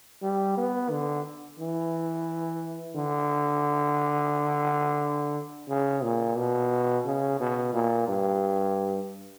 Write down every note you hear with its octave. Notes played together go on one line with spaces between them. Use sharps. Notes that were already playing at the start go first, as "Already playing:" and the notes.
G3
B3
D3
E3
D3
C#3
A#2
B2
C#3
B2
A#2
G2